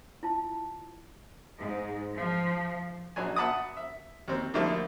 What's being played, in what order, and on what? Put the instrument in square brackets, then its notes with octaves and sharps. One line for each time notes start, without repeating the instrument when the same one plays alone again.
[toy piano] E4 F4 A5
[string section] G#2
F3
[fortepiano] A#1 F#3 D4 G#5
E5 F#5 A5 B5 D6 D#6
E5
D#2 C4
D3 F3 G3 A3 A#3 D#4